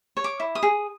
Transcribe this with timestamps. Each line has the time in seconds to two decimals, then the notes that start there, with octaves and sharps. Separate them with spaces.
0.17 C#5
0.24 D6
0.40 E4
0.55 D#6
0.63 G#4